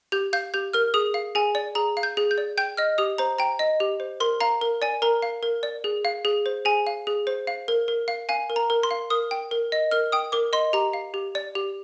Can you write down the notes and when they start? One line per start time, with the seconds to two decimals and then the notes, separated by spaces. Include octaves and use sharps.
0.12 G4 G6
0.33 F5 G6
0.54 G4 G6
0.73 A#4 F6
0.94 G#4 D#6
1.14 F5
1.35 G#4 G#5
1.55 D5
1.75 G#4 A#5
1.97 F5
2.03 G6
2.17 G#4
2.31 G6
2.38 D5
2.58 G5 G6
2.77 D#5 F6
2.98 G4 D#6
3.18 C5 A#5
3.38 G5 A#5
3.59 D#5
3.80 G4
4.00 C5
4.20 A#4 C6
4.41 F5 A#5
4.61 A#4
4.82 D5 G#5
5.02 A#4 A#5
5.22 F5
5.43 A#4
5.63 D5
5.84 G#4
6.05 F5
6.25 G#4
6.46 C5
6.65 G#4 G#5
6.87 F5
7.07 G#4
7.27 C5
7.47 F5
7.68 A#4
7.88 A#4
8.08 F5
8.29 F5 G#5
8.50 A#4
8.56 A#5
8.70 A#4
8.83 C6
8.91 F5
9.10 A#4 D#6
9.31 G5
9.51 A#4
9.72 D#5
9.91 A#4 F6
10.12 G5 D#6
10.32 A#4 D6
10.53 D#5 C6
10.73 G4 A#5
10.93 F5
11.14 G4
11.35 D5
11.55 G4